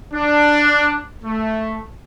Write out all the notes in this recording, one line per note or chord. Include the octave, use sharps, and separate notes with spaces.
D4
A3